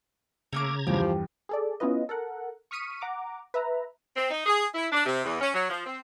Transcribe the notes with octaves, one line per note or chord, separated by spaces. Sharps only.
C#3 A3 A#3 A#5 D6 G#6
E2 G2 F3 G4
G#4 A4 D5
B3 C#4 E4 F4 B4 D#5
A4 A#4 F#5
C#6 D#6 F6 B6 C#7 D#7
F#5 A#5 D6
B4 E5 A#5
C4
D#4
G#4
E4
D4
C3
E2
C#4
F#3
F3
C4